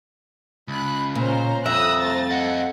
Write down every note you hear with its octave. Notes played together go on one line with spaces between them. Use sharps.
C#2 B5 F#6
A#2 C#4 C5 A#5
C2 F2 E5 A#5 D#6 E6 F#6
A3 C5 A6
A4 D#5 F#5